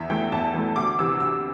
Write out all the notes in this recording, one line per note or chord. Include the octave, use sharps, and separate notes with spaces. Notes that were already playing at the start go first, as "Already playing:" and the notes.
Already playing: E2 E5
E3 A3 G5
E2 A5
E3 A3
D2 D6
C3 E3 E6
D2 E6